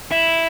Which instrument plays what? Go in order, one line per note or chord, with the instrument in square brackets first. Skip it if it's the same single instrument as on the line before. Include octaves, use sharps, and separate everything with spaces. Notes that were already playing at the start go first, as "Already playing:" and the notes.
[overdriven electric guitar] E4